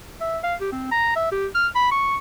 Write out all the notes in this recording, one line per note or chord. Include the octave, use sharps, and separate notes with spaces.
E5
F5
G4
C4
A#5
E5
G4
F6
B5
C#6